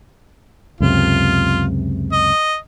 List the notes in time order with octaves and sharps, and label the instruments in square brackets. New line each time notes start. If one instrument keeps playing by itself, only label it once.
[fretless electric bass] C#2 F#2 C3 [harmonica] F4
[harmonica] D#5